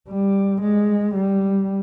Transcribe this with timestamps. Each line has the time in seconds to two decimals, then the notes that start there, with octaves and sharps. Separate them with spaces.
0.09 G3
0.62 G#3
1.15 G3